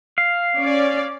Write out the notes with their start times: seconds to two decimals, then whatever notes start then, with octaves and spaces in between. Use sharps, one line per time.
0.18 F5
0.58 C#4 D5